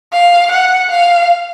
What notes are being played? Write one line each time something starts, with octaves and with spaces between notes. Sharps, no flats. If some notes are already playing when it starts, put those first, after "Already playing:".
F5
F#5
F5